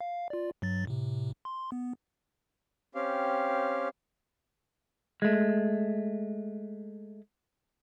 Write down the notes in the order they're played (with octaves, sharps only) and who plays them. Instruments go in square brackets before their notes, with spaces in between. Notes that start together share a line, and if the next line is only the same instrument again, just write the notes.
[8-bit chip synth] F5
F4 D5
G2 F#3 A6
A2 C3
C6
B3
[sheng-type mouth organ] C4 C#4 G4 F5
[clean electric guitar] G#3 A3